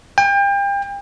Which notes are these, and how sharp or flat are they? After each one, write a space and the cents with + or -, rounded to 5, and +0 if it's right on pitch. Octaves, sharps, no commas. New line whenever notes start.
G5 +35